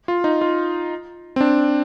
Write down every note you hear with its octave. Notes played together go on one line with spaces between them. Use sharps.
F4
D#4
F4
C4
D4